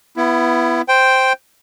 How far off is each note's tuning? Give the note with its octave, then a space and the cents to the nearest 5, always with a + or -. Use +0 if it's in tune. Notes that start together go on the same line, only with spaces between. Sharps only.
B3 +0 E4 +25
C5 +0 G5 +0